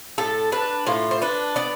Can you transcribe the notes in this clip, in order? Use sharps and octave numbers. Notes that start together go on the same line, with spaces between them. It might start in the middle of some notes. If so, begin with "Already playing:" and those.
A2 A4
D4 B4
A2 F4
C5
D4 B4
B3 D5